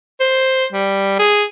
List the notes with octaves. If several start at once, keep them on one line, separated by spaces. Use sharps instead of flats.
C5
G3
G#4